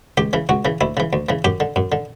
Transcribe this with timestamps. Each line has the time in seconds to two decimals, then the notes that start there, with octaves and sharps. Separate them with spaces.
0.17 C#2 G4
0.33 C#3 E3
0.49 C#2 F#4
0.65 C#3 E3
0.81 D2 E4
0.97 C#3 E3
1.13 D2
1.29 C#3 E3
1.45 F#2 G4
1.60 D3
1.76 F#2
1.92 D3